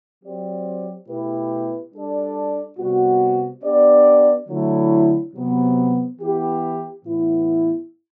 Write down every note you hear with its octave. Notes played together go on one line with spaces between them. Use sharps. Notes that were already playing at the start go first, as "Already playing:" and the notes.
F#3 C4 G4 D5
B2 A3 E4 G4 B4
G3 D4 A4 D5
C3 G3 B3 F#4
B3 D4 G4 D5
D3 F#3 A3 E4
C3 F#3 B3
E3 B3 E4 G4
A2 E3 B3 E4